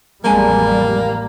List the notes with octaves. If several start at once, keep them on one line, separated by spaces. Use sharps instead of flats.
A1 F2 G3 G#3 A#3 G#5